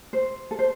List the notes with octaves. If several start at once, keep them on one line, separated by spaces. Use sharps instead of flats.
C5
A4
C5